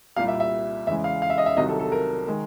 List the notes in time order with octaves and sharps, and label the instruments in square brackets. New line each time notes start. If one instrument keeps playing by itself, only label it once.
[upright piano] C2 A#2 G3 F5
E5
E5
E2 C#3 E3 G#3 E5
F5
F5
E5
D#5
E5
C2 C3 D#3 F#3 D#5
A4
A4
A#4
D#3 G#3